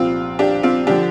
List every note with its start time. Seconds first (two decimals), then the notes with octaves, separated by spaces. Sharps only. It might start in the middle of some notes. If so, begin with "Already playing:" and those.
Already playing: C2 A#2 F3 C4 F4
0.39 D4 G4
0.63 C4 F4
0.87 D3 F3 D4 G4